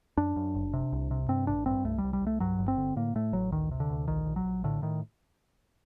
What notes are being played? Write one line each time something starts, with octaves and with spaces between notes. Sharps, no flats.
F#2 D4
F#2
F#1
C3
C2
C3
G2 C4
A1 D4
G2 C4
C2 A3
G3
C2
G3
C2
A3
G2 F#3
G1
C4
D3
A2 A#3
A2 A3
A1 F#3
D2 D#3
C3
D3
D2
A#1 D#3
A#1
F#3
A#1
A2 D3
A2 D#3